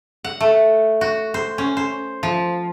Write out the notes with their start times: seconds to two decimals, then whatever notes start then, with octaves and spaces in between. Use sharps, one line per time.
0.24 F#5
0.40 A3
1.01 F#4
1.34 C5
1.58 C#4
1.77 C5
2.23 F3